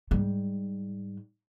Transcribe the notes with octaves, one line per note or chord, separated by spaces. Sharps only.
G#2 G3